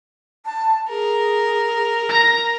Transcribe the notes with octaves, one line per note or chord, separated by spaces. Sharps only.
A5
G#4 A#4
A#5 A#6